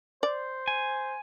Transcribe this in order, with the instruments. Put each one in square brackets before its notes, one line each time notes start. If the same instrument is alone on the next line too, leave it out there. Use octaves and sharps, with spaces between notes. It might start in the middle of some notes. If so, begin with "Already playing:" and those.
[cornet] C5 [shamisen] D5
[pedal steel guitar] G#5